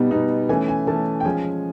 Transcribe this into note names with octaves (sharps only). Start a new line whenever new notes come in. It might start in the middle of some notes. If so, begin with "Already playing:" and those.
Already playing: B2 G3 B3 D#4
B2 G3 B3 D#4
E3 A3 C#4 G#5
G#5
E3 A3 C#4 A5
G5
F3 G#3 C#4 G#5